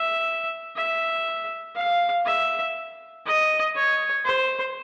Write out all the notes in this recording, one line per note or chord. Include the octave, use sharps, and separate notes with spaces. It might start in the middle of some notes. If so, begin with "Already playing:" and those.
Already playing: E5
E5
F5
E5
D#5
C#5
C5